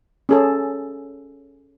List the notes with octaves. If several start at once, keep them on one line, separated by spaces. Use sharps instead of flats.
C#4 G#4 A4